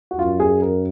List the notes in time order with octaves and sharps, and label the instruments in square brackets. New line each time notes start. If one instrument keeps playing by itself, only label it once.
[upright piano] F#4
[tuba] F#2 [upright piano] F4
[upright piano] G#4
A#4